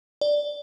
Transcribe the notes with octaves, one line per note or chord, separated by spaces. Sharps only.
D5